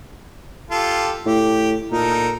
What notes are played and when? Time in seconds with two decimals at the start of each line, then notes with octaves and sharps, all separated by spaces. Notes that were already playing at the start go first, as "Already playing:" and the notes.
0.71 F4 G4 A4
1.26 A2 G4
1.92 A#2 D#4 A4 A#4